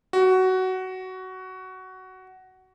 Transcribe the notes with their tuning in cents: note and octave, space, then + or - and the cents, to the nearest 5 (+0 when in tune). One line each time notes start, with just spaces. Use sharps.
F#4 +15